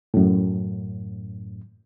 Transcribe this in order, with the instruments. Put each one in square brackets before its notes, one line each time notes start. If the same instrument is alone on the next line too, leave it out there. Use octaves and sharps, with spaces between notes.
[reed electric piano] F#2 A2